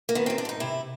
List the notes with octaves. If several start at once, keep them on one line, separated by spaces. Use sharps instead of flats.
A#3
D#3 B3
G#2 C4
D4
G#2 D#4
C3 E4